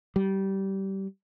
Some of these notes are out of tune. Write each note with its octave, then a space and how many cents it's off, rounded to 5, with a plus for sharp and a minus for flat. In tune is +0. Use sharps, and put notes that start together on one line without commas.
G3 -20